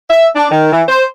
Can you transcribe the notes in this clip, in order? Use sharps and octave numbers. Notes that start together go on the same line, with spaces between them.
E5
D4
D#3
E3
C5